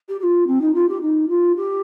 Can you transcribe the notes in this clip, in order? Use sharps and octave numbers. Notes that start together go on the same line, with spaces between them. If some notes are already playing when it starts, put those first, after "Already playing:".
G4
G4
F4
C4
D#4
F4
G4
D#4
F4
G4